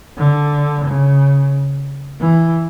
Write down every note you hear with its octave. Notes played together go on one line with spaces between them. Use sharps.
D3
C#3
E3